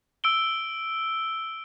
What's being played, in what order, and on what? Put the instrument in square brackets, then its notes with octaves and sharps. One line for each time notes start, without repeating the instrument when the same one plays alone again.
[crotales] E6 D7 G7